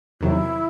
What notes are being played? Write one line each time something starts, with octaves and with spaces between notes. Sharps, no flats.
E2 C3 D#3 F#3 E4